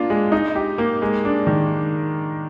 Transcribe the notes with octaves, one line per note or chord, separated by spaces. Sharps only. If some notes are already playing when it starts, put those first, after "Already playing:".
Already playing: A#3 D4 F4
G#3
D#4
G4
A#3
G#3
D4
D#3